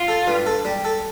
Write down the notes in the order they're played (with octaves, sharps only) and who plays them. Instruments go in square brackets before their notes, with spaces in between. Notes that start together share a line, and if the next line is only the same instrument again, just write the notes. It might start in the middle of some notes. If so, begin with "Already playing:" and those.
Already playing: [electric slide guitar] F4
[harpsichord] A4
G2
A4
G3
A4